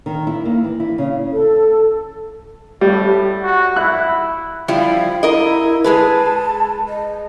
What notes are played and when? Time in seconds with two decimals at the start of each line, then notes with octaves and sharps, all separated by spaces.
0.06 D#3
0.27 E4
0.45 A#3
0.64 E3
0.80 E4
0.98 C#3
1.31 A4
2.81 A2 G3
3.43 F#4
3.76 E4 F#6
4.68 F3 G3 E4 F5
5.23 E4 A#4 D#5
5.84 G#3 G#4 B4 A5
6.88 D#5